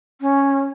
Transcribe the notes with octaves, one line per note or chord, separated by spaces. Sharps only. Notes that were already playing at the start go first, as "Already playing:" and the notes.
C#4